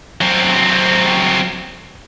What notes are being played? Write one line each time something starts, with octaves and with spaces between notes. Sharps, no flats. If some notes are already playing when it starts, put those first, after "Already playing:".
F#3 C4